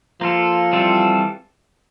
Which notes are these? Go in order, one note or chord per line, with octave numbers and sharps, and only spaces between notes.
F3 A#3 F4 A4
E3 G3 C4 F4 A4